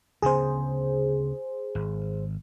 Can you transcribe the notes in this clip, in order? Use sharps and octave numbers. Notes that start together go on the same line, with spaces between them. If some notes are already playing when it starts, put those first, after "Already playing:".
D2 C#3 B3 G#4 C5
G#1